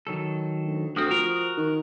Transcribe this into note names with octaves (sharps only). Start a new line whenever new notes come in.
D#3 F#3 A4
D2
D2 G2 C4 F#4 D#6 F6
F3 A#4
D#3